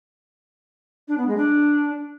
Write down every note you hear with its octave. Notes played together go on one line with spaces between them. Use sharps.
D4
B3
G#3
D4